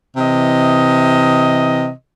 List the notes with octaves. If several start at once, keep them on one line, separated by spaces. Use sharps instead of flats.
C3 E3 D#5